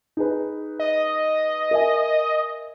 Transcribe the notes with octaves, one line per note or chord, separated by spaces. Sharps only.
D#4 G#4 B4
D#5
A#4 E5 G#5